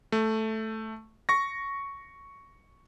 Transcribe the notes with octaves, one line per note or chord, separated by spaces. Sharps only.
A3
C#6 A#6